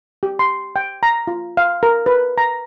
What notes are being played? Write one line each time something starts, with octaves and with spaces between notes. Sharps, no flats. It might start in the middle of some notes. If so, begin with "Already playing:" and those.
G4
C6
G5
A#5
F4
F5
A#4
B4
A#5